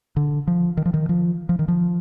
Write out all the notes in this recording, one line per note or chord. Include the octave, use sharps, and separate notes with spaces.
D3
F3
D#3
F3
D#3
F3
F3
D#3
F3